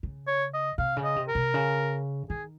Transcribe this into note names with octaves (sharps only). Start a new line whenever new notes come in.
C#3
C#5
D#5
C3 F5
C#3
D#5
C3
A#4
C3
C#3
D#3 G#4